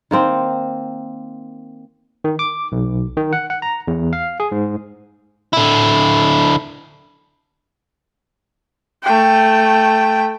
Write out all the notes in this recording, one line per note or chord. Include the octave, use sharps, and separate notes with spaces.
D#3 A#3 C4
D#3
D6
B1
D#3
F#5
F#5
A#5
E2
F5
G#4
G#2
D3 E4
A3 G5